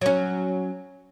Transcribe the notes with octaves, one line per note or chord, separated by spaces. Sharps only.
F#3 C#4